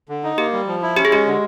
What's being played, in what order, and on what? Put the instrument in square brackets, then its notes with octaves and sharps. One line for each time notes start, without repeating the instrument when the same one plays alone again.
[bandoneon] D3
D#4
[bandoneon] A#3 [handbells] G4
[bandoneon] G3
F3
E4
[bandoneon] C#4 [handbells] G4
[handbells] G#4
[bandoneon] G#3 [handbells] G4
[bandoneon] D3